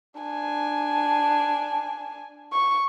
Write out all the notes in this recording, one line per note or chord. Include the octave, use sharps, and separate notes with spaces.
D4 G#5
C#6